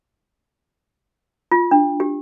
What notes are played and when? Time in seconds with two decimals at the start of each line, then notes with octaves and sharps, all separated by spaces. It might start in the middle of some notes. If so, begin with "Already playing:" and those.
1.52 F4
1.71 D4
2.00 G4